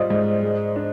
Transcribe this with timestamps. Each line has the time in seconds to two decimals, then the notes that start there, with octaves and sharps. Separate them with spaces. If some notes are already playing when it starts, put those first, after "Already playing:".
Already playing: G#2 G3 F4 C5 D5 D#5
0.10 G#2
0.43 G#3
0.76 D4